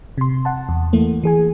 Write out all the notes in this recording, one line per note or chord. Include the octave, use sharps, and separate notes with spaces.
C3 C6
F#5 A5
E2
E3 A3 A#3
E3 G#4 G#5